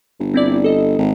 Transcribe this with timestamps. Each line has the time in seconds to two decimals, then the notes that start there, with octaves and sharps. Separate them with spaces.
0.20 G1
0.34 C4 E4 D5
0.64 A4 D#5
0.99 G#1